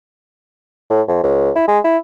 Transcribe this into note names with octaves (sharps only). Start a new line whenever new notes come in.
A2
F2
C#2
E4
G#3
E4